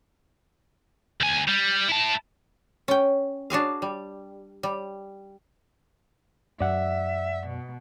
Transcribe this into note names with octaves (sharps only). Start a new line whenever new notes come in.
D2 G#5
G3
E4 A5
C#4 G5
D4 F#4 G#4 F5
G3
G3
F#2 D5 E5 F#5
B2